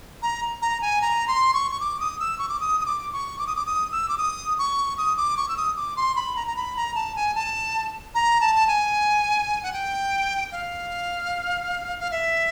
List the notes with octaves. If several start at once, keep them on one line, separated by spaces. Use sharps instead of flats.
A#5
A#5
G#5
A#5
C6
C#6
C#6
D6
D#6
E6
C#6
D6
D#6
D#6
D6
C#6
D6
D#6
D6
D#6
E6
D6
D#6
C#6
D#6
D6
C#6
E6
D#6
D6
C6
B5
A#5
A#5
B5
A#5
A5
G#5
A5
A#5
A5
A5
G#5
F#5
G5
F5
F5
E5